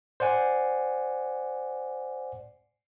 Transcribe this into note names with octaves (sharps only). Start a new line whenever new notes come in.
C5 D5 F#5 G#5